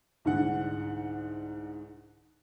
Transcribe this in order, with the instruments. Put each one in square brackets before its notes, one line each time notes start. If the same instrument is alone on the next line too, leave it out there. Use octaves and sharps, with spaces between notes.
[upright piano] C2 G#2 D3 F#5